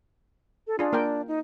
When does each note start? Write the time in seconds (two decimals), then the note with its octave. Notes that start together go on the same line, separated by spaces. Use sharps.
0.67 A4
0.79 D4 F4 G#4
0.93 A#3 A#4 G5
1.28 D#4